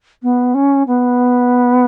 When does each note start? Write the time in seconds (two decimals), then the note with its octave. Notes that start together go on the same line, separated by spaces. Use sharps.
0.22 B3
0.54 C#4
0.87 B3